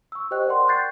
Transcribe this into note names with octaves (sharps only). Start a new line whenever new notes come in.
C#6 E6
G4 C5 D#5 G5 F#6
A#4 D5 F#5 G5 C6
C#6 F#6 G6 A6 C7